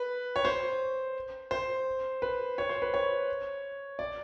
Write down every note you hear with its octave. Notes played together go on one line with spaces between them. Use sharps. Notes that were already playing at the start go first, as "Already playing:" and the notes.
Already playing: B4
C#5
C5
C5
B4
C#5
C5
B4
C#5
D5